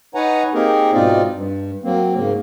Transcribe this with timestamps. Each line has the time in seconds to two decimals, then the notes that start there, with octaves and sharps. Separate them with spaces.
0.15 D#4 B4 C#5 F#5 G#5 A#5
0.54 A#3 C4 D#4 G4 G#4 A#4
0.93 G#2 B2 C4 D#4 F4 D5
1.33 G2
1.83 F#3 A#3 C4
2.15 G#2 C#3 A#3